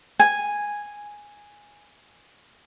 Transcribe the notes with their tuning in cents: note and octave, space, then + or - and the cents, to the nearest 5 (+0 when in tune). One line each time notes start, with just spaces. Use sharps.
G#5 -5